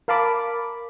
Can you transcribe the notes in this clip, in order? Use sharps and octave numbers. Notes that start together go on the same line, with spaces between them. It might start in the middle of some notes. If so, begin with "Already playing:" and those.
A#4 F5 A5 B5 D6